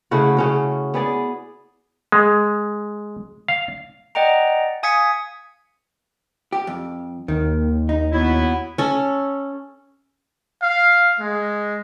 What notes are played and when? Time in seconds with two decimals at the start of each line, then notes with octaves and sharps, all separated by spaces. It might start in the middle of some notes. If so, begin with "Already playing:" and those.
0.11 C#3 A3 E4 F#4
0.37 C#3 C#4 F#4
0.94 B3 G#4 D5
2.12 G#3
3.48 F5
4.15 D5 D#5 F#5 G5 A#5
4.83 F5 G#5 D#6 G#6 B6 C#7
6.53 G4
6.67 F2
7.28 D#2 D#3
7.89 D#4
8.12 F#3 B3 E4
8.78 C#4 A4
10.62 F5
11.20 G#3